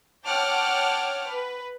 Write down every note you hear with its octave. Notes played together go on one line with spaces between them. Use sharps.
C#5 F#5 G5 A5 D6 F6
B4